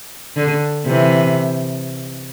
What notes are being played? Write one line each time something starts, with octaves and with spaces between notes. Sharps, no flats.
D3
C3 E3